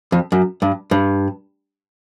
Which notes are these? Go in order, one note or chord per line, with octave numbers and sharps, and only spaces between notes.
F2
F#2
G2
G2